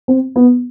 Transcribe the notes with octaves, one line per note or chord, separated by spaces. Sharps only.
C4
B3